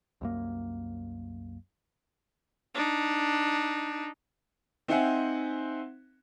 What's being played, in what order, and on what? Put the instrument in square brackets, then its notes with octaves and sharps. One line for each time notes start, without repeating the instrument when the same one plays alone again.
[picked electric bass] C2 F#2 A#3
[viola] D4 D#4
[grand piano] C4 D#4 C5 E5 F#5 G#5